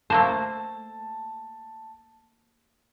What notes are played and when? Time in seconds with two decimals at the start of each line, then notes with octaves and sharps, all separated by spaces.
0.10 A3 A#3 C5 A5